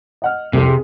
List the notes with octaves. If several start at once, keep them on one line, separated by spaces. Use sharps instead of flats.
D#5 F#5 F6
C2 F2 C3
G#4